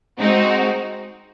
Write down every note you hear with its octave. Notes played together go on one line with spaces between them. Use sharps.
G#3 C4 D#4 F#4